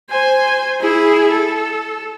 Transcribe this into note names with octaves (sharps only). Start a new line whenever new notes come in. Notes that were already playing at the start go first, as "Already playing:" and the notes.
C5 G#5
E4 G#4
A4